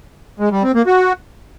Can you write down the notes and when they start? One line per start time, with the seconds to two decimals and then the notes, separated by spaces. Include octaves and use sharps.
0.40 G#3
0.51 G3
0.63 C4
0.75 A#3
0.87 F#4